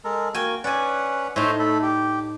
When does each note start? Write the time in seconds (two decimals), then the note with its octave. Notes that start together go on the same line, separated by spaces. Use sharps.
0.04 G#3 A4 A#4
0.35 A#3 F#4 G5 G#5
0.64 C#4 B4 D5 F#5 G#5
1.36 A2 D#4 C5 C#5 E5
1.59 A3 A4 B5
1.83 G4